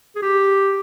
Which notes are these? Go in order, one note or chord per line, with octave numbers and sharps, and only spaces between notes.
G#4
G4